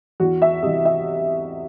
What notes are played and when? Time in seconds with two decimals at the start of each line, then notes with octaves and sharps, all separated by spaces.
0.20 E2 F#4
0.42 E5
0.63 C3 E3 D#5
0.85 E5